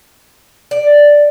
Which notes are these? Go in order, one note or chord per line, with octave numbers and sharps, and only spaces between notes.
D5